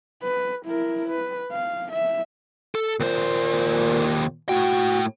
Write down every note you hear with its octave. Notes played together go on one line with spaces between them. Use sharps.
B4
E4 A#4
B4
F5
E5
A4
D#2 A#2 C5
A2 F#4 G5